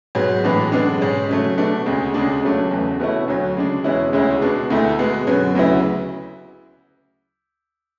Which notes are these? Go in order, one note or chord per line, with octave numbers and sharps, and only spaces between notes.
G#2 F#3 B3
A2 E3 G#3 D4
F#2 D3 G#3 B3 D4
G#2 G#3 C#4
C#3 F#3 A3
B2 A3 D4
D2 C#3 G#3
D2 C#3 G#3 D4
C#2 C#3 F#3 A3 D4
E2 C#3 E3 A3
B2 A3 C#4 E4
D2 D3 F#3
C#3 G#3 D4
E2 B2 G#3 C#4 E4
D2 C#3 G#3 C#4 E4
B2 G#3 D4
D2 D3 A3 E4
B2 G#3 B3
F#2 D3 F#3 B3
D2 C#3 F#3 B3 E4